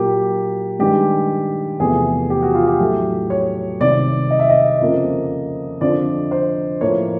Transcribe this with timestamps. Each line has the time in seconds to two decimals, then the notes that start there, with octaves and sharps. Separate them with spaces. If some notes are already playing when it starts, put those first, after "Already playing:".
Already playing: A#2 F#3 A#3 G4
0.79 G2 D#3 G#3 G4
1.80 E2 C3 F3 A3 G#4
2.30 G4
2.42 F#4
2.54 F4
2.67 G4
2.80 A2 F#3 A3
3.30 C#5
3.80 C2 C3 D#3 D5
4.30 D#5
4.39 E5
4.49 D#5
4.81 F2 C#3 F3 A#3
5.81 F2 D3 F3 D5
6.31 C5
6.81 A2 F3 A#3 C#5